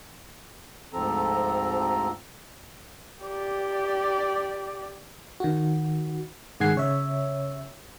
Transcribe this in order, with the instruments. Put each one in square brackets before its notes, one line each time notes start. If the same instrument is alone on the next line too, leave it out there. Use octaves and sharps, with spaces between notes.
[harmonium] D2 G#2 F3 C4 A4 A#5
[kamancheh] G4 D5
[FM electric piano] D#3 F#4
G#2 D#3 G#4 F#5 G#6 C7
C#3 C#5 E5